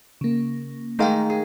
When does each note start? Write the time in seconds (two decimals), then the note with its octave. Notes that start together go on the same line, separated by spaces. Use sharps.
0.21 C#3 A#3
0.99 D#3 G#3 A3 A#4 F5 G5
1.30 G#4